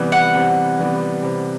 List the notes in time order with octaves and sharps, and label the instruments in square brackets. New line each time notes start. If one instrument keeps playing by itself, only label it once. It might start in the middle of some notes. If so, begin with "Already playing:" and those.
Already playing: [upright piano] C3 E3 G3 B3
[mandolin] F#5
[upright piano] C3
E3 G3 B3
C3